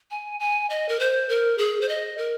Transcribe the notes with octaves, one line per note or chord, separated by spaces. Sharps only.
G#5
G#5
D#5
A#4
C5
A#4
G#4
C5
D#5
A#4